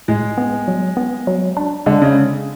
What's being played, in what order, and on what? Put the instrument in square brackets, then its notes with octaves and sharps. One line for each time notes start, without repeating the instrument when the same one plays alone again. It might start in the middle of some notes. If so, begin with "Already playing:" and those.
[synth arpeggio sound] A2 [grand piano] G#3
[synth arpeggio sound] B3
F#3
B3
F#3
D4
[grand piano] D3 [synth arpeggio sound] G#3
[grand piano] C#3